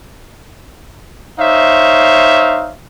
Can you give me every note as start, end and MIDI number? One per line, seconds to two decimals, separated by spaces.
1.40 2.75 63
1.40 2.75 72
1.40 2.75 73
1.40 2.75 76
1.40 2.75 77